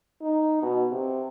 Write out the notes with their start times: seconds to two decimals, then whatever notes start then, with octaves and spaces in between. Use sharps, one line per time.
0.22 D#4
0.62 B2
0.91 C3